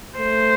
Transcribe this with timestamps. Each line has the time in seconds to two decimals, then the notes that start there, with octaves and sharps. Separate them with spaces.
0.17 A3 C5